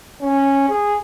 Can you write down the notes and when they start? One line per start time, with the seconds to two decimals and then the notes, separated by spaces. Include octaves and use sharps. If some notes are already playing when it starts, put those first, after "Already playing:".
0.21 C#4
0.69 G#4